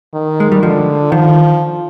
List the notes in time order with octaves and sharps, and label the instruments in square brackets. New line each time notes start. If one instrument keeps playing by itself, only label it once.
[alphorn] D#3
[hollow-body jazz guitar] G#3
G3
[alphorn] D3 [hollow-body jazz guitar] F3
[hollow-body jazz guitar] D#3 [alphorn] F3